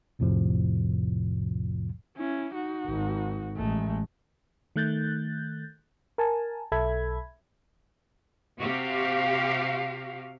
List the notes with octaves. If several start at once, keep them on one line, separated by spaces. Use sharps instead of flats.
B1 F2 A2 C3 F3
C#4 E4
D#4 F#4
G#1
A1 G#3 A3
D#3 A3 F#6 G6 A6
A#4 G#5 A5
B1 A4 E5 B5 G#6
C3 F#4 G4 F5